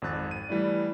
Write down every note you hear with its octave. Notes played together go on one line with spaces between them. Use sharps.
G#1 F2 F#6 A6
D#7
E3 G3 A3 E4 D5